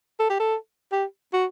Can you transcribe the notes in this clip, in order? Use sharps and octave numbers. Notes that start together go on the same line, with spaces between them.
A4
G4
A4
G4
F#4